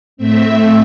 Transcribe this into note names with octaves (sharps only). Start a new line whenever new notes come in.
A2 A3 C4 E5